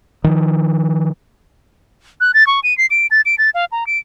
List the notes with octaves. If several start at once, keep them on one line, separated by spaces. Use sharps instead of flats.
D#3 F3
F#6
A6
C#6
D#7
C7
D7
A6
D7
A6
F5
A#5
D7